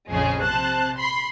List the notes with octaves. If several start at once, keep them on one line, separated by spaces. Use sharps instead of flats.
A#1 F2 C#3 G#3 G#4
C3 C5 A5 F#6
B5 C6 C7